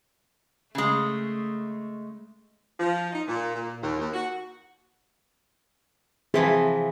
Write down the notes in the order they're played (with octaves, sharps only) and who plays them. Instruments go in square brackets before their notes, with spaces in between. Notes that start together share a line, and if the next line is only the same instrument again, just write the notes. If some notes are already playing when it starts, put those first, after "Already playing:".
[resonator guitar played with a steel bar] C#3 G#3 [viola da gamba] A3
[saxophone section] F3
D#4
A#2
A#2
D#2
D#2
F#4
[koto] C3 E3 F3 [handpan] G#4